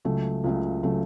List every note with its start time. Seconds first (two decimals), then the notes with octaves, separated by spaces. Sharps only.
0.05 C#2 C#3 F#3 A3
0.44 C#2 C#3 F#3 A3
0.83 C#3 F#3 A3